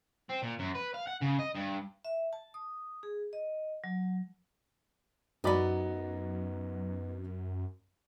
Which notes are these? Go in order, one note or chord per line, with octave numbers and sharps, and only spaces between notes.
C4
A#2
F#2
B4
F5
F#5
C#3
D#5
G2
E5
A5
D#6
G#4
D#5
F#3
F#2 F#3 B3 D#4 D5 B5